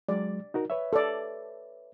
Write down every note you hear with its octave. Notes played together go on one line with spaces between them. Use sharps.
F#3 G#3 D5
D#4 F#4 A#4
B4 C#5 E5
A4 D5